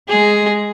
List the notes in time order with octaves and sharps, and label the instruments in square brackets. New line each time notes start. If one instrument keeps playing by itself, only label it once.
[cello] G#3 [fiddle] G#4